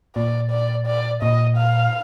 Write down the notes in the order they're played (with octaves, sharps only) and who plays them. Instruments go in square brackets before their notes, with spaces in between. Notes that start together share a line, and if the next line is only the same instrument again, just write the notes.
[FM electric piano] A#2 [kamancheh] D5
[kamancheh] D5
D5
[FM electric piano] A#2 [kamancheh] D#5
[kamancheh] F5